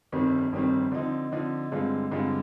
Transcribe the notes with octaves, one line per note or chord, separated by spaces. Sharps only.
G1 F2 D#3 G3 C4
G1 F2 D#3 G3 C4
D3 F3 C4 D#4
D3 F3 C4 D#4
G2 D3 G#3 C4 F4
G2 D3 G#3 C4 F4